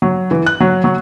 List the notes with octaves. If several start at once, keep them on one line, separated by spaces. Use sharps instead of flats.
F#3
E3
F#6
F#3
F#3